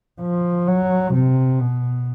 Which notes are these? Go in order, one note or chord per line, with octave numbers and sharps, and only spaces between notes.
F3
F#3
C3
B2